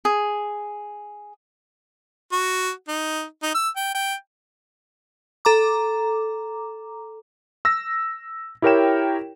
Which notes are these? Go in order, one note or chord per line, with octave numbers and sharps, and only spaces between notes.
G#4
F#4
D#4
D#4
E6
G5
G5
A4 A#5 D6
E6 A#6
E4 G4 A#4 C#5 G5 E7